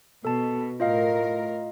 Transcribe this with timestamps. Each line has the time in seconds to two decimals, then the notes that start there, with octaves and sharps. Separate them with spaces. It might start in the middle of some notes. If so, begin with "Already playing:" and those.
0.25 B2 A4 A5
0.80 A2 F4 A#4 D#5 F5